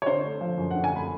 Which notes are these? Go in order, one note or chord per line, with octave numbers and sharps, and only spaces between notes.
C#5
D3 C5
A3
F3
F#2
F#5
D3
G#5
A3 B5